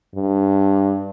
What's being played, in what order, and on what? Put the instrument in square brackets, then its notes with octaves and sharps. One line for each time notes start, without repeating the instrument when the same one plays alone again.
[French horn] G2